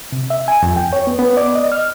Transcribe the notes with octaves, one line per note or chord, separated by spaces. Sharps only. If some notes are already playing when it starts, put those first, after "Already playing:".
C3
E5
G#5
F2
G5
C#5
B3
B3
D5
D#5
F6